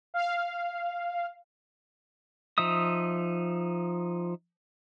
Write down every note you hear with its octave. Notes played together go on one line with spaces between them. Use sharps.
F5
F3 D#4 E5 D#6